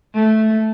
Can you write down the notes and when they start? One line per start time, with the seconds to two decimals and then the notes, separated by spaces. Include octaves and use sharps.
0.15 A3